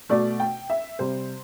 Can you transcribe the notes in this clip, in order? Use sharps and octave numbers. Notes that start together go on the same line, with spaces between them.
B2 A3 D5
G5
E5
C3 G3 C5